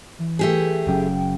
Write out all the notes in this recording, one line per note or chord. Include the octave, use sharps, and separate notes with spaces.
E3
A3 G4 G#4
F#1 F#2 G5